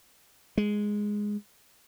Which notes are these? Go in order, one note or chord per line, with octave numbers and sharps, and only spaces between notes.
G#3